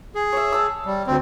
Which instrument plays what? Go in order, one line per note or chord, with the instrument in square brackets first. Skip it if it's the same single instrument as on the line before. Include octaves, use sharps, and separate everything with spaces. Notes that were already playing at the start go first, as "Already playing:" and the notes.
[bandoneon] G#4
[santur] C#5 E5
A5 E6
[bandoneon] G3
D2 C4